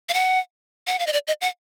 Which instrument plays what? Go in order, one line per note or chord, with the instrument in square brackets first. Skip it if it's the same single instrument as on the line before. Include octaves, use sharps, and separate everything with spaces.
[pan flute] F5
F#5
F#5
F5
D#5
D5
D#5
F#5